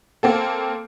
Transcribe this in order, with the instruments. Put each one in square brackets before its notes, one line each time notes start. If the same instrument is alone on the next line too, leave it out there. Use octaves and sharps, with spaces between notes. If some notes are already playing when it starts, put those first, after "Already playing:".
[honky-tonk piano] A#3 C4 A4